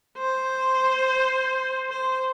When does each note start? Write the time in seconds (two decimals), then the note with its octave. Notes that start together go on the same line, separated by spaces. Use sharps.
0.18 C5
1.90 C5